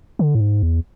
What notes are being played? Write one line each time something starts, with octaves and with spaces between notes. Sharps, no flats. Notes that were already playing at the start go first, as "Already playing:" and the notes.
D3
A2
G#2
E2